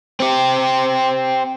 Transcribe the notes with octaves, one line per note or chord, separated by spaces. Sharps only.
C4 G4